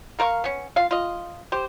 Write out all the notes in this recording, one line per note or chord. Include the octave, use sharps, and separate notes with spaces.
A#3 A#4 F5 C#6
B3 C#4
F4 F5
F4 D#5
G4 C5